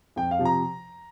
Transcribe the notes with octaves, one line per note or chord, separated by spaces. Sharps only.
F2 G5
F5
C3 F3
A#5